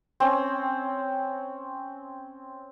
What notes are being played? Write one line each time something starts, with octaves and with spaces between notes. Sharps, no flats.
C4 C#4